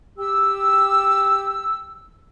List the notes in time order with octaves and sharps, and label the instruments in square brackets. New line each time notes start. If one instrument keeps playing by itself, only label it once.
[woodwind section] G4 E6